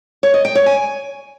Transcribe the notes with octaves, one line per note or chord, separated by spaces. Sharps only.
C#5
D#5
G5
C#5
G#5